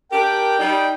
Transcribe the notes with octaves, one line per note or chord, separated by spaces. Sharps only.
D4 G4 A#4 G5
G3 D#4